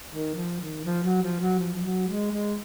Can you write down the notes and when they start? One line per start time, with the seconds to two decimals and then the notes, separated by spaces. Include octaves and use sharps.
0.11 D#3
0.35 F3
0.60 D#3
0.84 F3
1.03 F#3
1.22 F3
1.39 F#3
1.59 F3
1.74 F3
1.83 F#3
2.08 G#3
2.32 G#3